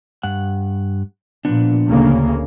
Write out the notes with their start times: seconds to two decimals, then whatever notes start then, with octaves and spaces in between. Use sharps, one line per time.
0.23 G2 F#5
1.45 A#2 F3 B3 D4
1.89 D2 C#3 A#3